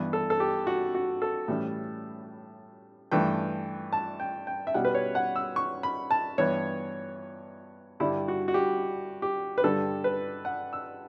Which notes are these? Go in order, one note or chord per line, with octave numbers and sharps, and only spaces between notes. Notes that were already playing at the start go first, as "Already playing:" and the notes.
Already playing: G2 E3 B3
A4
A4
G4
F#4
F#4
A4
A2 E3 G3 C#4
G2 E3 A3 G5
A5
G5
G5
E5
B2 G3 C#4 F#5
B4
C#5
F#5
E6
C#6
B5
A5
G2 E3 B3 C#5
G2 D3 G3 E4
F#4
F#4
G4
G4
B4
G2 D3 G3 A4
B4
F#5
E6